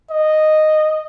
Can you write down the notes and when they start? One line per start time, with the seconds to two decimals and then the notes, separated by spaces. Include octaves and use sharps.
0.11 D#5